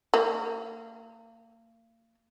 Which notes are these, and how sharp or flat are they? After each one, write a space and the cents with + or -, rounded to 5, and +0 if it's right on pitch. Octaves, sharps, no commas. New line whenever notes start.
A#3 -35